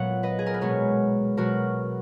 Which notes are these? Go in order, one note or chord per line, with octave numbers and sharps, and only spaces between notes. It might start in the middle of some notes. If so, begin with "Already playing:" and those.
Already playing: A#2 F#3 B3 F#5
B4 D#5
G#4
A#4
B4
B2 G#3 B3 A#4 C#5
B2 F#3 B3 F#4 A#4